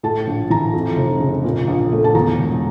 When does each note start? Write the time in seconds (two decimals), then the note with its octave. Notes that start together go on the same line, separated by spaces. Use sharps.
0.03 A2 A5
0.27 A#1
0.50 E3 A#5
0.74 F2
0.97 F1
1.20 C#3
1.44 A#2
1.67 A#1
1.92 A3
2.04 A5
2.15 E2 A#5
2.38 E1